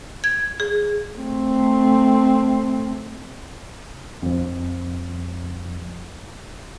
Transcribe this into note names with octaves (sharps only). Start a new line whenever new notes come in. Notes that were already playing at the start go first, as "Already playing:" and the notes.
G#6
G#4
A3 C4
F2 F3